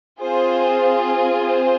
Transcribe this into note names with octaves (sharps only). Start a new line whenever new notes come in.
C4 F4 G#4 C5
C5